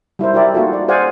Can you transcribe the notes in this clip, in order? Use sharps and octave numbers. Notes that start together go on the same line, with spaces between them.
G3 E4 A#4 C5
E4 G4 A#4 D5 E5
A#3 D#4 F4 F#4 A4
D5
G#4 C5 D5 F5 F#5 G#5